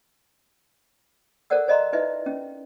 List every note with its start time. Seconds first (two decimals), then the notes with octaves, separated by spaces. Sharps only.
1.50 A4 A#4 C5 D5 F#5 E6
1.68 C5 D5 D#5 F5 A#5 C6
1.93 D#4 E4 B4 D#5 E5
2.26 C#4